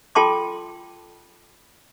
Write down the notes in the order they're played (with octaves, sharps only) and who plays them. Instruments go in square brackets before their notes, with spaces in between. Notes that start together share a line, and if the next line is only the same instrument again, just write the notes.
[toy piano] F4 A4 G5 A5 C6 D6